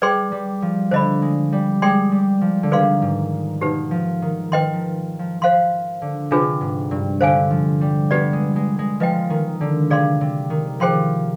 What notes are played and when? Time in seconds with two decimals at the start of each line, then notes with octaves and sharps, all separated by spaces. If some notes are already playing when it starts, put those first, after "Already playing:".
0.02 G3 G#4 B4 D5 G5 C6
0.32 G3
0.62 F3
0.91 D3 C5 D#5 B5
1.22 G#3
1.53 G3
1.82 G#3 G#4 D5 G5 C6
2.12 G3
2.41 F3
2.63 D3
2.71 D#3 G#4 B4 D5 F5 C6
3.02 G#2
3.61 B2 D#4 G4 B4
3.91 F3
4.22 D#3
4.52 D#3 B4 D#5 G5 C6
4.73 F3
5.19 F3
5.41 F3 C5 F5 C6
6.02 D3
6.31 C3 D4 F4 G#4 B4
6.61 G#2
6.91 G2
7.21 D3 C5 F5 G#5
7.50 F3
7.81 G3
8.11 B3 G4 B4 D5
8.33 G#3
8.56 G#3
8.79 G#3
9.00 F3 B4 D#5 G5
9.30 D#3
9.61 D3
9.90 C3 G#4 D5 F5 C6
10.21 C3
10.50 D#3
10.80 F3 G#4 C5 G5 C6